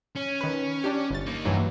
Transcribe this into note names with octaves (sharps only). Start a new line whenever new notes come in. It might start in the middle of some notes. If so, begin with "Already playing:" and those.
C#4
D#3 B4
D4 G4
G1 A6
A#3 D#4
G2 E3 F#3